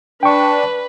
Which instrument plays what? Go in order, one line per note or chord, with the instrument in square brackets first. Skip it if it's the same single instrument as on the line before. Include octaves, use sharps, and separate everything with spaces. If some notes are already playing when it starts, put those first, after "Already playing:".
[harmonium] D4 [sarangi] B4 [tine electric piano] G5 C#6